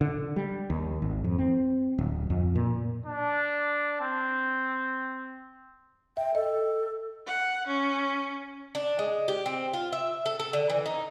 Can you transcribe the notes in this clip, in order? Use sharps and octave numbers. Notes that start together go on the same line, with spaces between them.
D3
G3
D#2
G#1
F2
C4
D1
F2
A#2
D4
C4
E5 G5
A4 D#5
F#5
C#4
D4
G#3
G4
C4
F4
E5
A4
A4
D3
E3
D#4